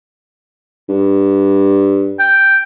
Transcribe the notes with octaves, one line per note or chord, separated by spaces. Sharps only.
G2
G5